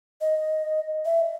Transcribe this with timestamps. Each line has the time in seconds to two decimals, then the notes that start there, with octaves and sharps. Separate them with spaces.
0.21 D#5
1.05 E5